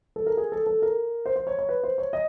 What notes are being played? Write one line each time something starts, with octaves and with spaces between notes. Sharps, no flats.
A4
A#4
G#4
A4
A4
A#4
C5
C5
C#5
C#5
B4
C5
C#5
D#5